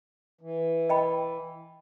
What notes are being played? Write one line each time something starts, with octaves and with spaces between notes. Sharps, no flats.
E3
D#5 G5 B5